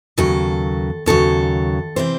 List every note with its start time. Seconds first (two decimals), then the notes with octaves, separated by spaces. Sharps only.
0.18 D#2 C#3 F#3 A4
1.06 D#2 C#3 F#3 A4
1.96 C3 E3 C4 C5